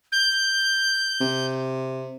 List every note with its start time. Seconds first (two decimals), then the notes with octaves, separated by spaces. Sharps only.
0.12 G6
1.21 C3